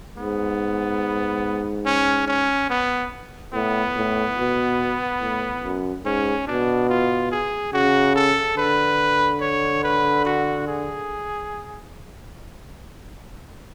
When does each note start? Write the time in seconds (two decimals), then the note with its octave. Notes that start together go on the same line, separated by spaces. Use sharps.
0.17 G#2 B3
1.85 C#4
2.28 C#4
2.69 B3
3.53 A2 B3
3.96 A2
4.37 B2
5.21 A2
5.63 F#2
6.05 G#2 C#4
6.47 B2 D4
6.89 F4
7.31 G#4
7.73 C#3 F#4
8.15 A4
8.57 D3 B4
9.41 C#5
9.83 B4
10.25 F#4
10.67 G#4